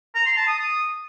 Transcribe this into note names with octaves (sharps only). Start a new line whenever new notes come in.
A#5
C6
A5
D#6
D#6